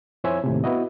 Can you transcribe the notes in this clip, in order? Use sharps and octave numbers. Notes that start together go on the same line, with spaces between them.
F2 E4 C5 C#5 E5 G#5
D#2 A2 C3
B3 E4 F#4 D#5